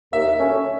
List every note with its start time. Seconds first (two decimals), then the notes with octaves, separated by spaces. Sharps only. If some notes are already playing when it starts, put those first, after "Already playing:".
0.12 D#2 E5
0.38 D3 F#3 A3 C#4